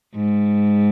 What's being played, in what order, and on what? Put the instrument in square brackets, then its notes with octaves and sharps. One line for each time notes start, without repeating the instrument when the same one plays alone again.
[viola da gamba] G#2